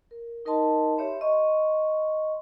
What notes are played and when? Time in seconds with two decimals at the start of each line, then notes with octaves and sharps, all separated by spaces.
0.11 A#4
0.45 D#4 A#4 D#5 A5 C6
0.97 G4 C#5 E5 B5 C6
1.21 D#5 C6 C#6